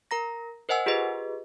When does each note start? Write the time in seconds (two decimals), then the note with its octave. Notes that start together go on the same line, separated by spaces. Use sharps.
0.11 A#4 A#5 A#6
0.69 A#4 C5 D#5 F#5 G#5 E6
0.86 F4 G4 G#4 B4 D#5